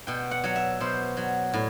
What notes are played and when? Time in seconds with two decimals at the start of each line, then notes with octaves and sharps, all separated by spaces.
0.07 B2 G5
0.31 F#5
0.44 F#3 F#5
0.56 E5
0.80 B2 C5
1.17 F#3
1.54 A2